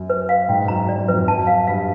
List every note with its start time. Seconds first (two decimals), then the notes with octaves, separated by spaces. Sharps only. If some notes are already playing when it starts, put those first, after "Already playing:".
Already playing: F#2
0.10 B4
0.29 F5
0.49 G#2 G5
0.68 F#2 A#5
0.88 F#2 D5
0.99 F#2
1.08 F2 B4
1.18 F#2
1.28 A5
1.47 F5
1.67 G2 F5